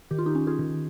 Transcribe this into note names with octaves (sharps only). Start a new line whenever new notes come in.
D#3 G4
F4
D#4 G4
C#4
F4 G#4
D#3